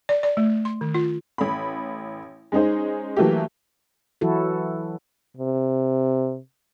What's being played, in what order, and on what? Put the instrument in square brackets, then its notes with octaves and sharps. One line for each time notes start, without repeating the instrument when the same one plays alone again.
[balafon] D5
D5
A3
C6
D#3
F4
[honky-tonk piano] A1 B5
G#3 C#4 D#4 G#4 C5
E3 F#3 A3 A#3 E4 G4
[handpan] E3 F#3 E4 F#4 A4
[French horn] C3